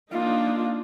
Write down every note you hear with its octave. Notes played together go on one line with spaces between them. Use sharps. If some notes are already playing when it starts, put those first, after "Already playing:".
A#3 D4 D#4 F4